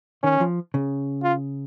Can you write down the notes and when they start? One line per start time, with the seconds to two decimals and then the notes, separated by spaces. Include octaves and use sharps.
0.23 D#3 C#4
0.41 F3
0.74 C#3
1.23 F4